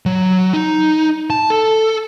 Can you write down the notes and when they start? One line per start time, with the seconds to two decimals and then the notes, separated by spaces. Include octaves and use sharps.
0.06 F#3
0.54 D#4
1.30 A5
1.50 A4